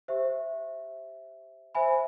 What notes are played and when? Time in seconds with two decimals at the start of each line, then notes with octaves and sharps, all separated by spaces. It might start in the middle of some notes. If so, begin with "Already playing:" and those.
0.08 G4 C5 E5
1.75 C5 E5 G#5 B5